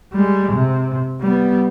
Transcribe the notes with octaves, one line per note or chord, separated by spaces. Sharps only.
G3 G#3
C3
G3 B3